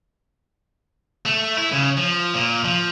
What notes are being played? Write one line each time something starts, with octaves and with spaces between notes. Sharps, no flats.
A3
E4
C#3
F3
A#2
F3